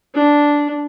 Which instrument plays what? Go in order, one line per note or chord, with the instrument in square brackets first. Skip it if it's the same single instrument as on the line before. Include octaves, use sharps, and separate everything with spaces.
[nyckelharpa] D4